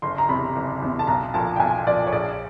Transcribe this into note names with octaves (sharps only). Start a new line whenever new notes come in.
F#1 C6
A#5
E2 C3 B5
F#1
E2 C3
A5
B1 A#5
A#2 F3 A5
G5
B1 G#5
A#2 F3 D5
C#5
A#1 D5